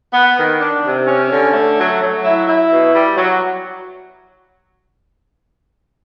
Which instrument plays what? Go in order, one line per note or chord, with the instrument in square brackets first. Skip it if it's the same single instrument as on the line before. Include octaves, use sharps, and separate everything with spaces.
[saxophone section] B3
D#3
D4
C3
C#4
D3
A3
F#3
F#3
E4
E4
B2
G3
F#3